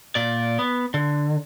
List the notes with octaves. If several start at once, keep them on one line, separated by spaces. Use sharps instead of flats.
A#2 D5
B3
D3